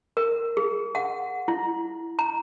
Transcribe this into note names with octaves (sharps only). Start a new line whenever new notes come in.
A#4
G#4
F#5
E4
A#5